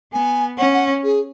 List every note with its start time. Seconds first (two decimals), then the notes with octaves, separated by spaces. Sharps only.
0.13 B3 G#5
0.58 C#4 F#5
0.74 F#5
1.04 G#4